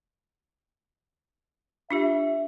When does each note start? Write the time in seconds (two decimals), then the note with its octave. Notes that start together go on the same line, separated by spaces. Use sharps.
1.91 D4 F4 G4 E5